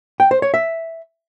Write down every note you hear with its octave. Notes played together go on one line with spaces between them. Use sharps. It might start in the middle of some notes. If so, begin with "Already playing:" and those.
G5
C5
C#5
E5